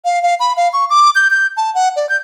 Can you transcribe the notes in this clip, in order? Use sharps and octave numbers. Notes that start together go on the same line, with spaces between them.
F5
F5
B5
F5
C#6
D6
G6
G6
A5
F#5
D5
G6